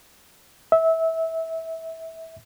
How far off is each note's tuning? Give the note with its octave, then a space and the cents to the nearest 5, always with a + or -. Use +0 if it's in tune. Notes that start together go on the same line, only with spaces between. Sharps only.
E5 -20